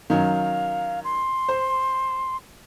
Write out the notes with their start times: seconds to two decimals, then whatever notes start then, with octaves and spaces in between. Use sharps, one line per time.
0.10 D#3 F#3 C#4 F5
1.04 C6
1.48 C5